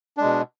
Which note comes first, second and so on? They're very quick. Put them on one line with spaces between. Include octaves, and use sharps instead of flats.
D4 G#3 B2